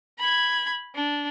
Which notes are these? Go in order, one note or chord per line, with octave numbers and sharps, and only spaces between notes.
B5 G#6
D4